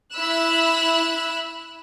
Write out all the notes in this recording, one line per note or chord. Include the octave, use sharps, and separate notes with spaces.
E4 B5 E6 F#6